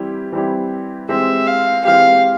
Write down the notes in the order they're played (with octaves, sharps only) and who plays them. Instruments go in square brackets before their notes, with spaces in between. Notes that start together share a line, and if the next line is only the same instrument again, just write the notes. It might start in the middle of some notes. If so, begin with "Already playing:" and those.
Already playing: [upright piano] E3 G3 C4 E4 G4
E3 G3 C4 E4 G4
[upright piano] E3 G#3 C4 G4 [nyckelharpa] E5
[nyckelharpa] F5
[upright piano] E3 G#3 C4 G4 [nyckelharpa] F5